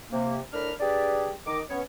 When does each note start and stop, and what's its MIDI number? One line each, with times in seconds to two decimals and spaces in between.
0.12 0.39 48
0.12 0.39 58
0.53 0.72 45
0.53 0.72 62
0.53 0.72 70
0.53 0.72 83
0.53 0.72 89
0.80 1.32 62
0.80 1.32 67
0.80 1.32 68
0.80 1.32 71
0.80 1.32 74
1.47 1.61 51
1.47 1.61 75
1.47 1.61 86
1.70 1.82 59
1.70 1.82 61
1.70 1.82 73